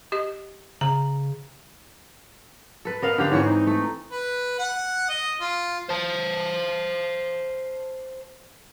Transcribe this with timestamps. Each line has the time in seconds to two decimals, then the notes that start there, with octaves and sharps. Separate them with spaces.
0.12 G4 D#5
0.81 C#3 A#5
2.85 A4 B4
3.02 B3 A#4 D#5 F5
3.18 D3 G4 F5
3.31 G#2 E3 C4 C#5
3.45 D#4
3.67 A3
4.12 B4
4.59 F#5
5.09 D#5
5.41 F4
5.89 C5 A5